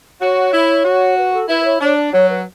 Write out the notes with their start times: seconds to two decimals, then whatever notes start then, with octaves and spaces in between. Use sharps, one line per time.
0.21 F#4 C#5
0.53 E4
0.85 F#4
1.17 B4
1.33 A4
1.48 E4 B4
1.60 B4
1.64 C#5
1.80 D4 C#5
1.96 D5
2.12 F#3 C#5
2.29 B4